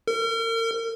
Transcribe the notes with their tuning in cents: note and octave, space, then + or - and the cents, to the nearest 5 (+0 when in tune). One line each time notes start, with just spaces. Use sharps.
A#4 -40